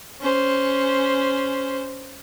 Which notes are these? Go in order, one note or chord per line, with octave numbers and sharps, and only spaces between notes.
C#4 C5